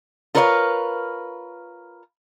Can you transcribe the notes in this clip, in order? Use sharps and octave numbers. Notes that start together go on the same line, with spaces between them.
F4 A#4 B4 C#5 D5 F5